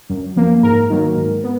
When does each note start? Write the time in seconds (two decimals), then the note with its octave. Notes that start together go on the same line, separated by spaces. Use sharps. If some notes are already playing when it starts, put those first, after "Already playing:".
0.10 F#2
0.36 F3 A#3
0.63 G#2 A#4
0.90 D#3 F#3 A#3
1.17 G#2
1.44 B3